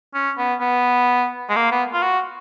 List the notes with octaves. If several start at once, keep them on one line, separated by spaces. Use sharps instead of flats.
C#4
B3
B3
G#3
A#3
B3
F4
F#4